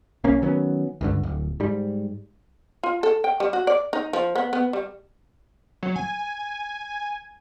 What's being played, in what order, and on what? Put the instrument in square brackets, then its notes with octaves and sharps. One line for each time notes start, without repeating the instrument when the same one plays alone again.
[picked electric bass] B1 A#3 C#4
D#3 F#3 B3 C#4
C#2 G2 D3
D1
G#2 G3
[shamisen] F4
A4
G5
G3
F#4
D5
D#4
F3
B3
B3
G3
[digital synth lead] F#3
G#5